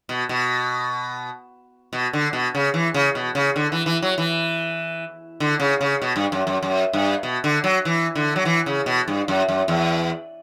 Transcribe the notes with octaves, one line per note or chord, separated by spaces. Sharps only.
B2
B2
B2
D3
B2
C#3
E3
C#3
B2
C#3
D3
E3
E3
F#3
E3
D3
C#3
C#3
B2
G2
F#2
F#2
F#2
G2
B2
D3
F#3
E3
D3
F#3
E3
C#3
B2
G2
F#2
F#2
E2